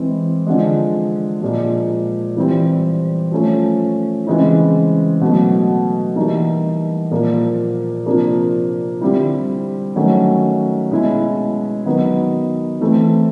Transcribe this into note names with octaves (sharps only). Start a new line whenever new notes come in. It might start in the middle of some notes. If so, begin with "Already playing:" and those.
Already playing: E3 G#3 C4
D3 F3 G#3
A#2 F3 G#3
E3 G3 C4
F3 A3 C#4
C#3 E3 G#3 C4 E4
B2 F#3 A3
E3 G3 A#3 D#4
A#2 F3 A#3
C3 F3 A#3 D4
D3 G3 C4 E4
D#3 F#3 A3 C#4
B2 G#3 C#4 E4
D#3 F#3 B3 D#4
E3 A3 C4